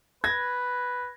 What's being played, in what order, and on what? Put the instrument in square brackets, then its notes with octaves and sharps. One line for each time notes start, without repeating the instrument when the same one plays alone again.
[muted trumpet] B4 [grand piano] G#6 A#6